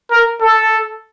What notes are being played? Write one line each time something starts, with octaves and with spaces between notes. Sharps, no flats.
A#4
A4